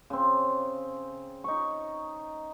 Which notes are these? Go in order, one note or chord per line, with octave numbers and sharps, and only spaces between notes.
C#3 C4
D#4 C#6